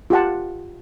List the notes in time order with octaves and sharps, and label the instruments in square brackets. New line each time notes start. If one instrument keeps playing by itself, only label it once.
[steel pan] F4 G4 F#5 A5